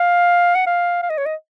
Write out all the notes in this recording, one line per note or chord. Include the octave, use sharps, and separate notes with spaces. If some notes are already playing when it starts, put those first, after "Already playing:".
Already playing: F5
F#5
F5
F5
D#5
C#5
D#5